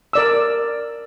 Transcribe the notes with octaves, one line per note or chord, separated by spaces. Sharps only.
A#4 D5 E6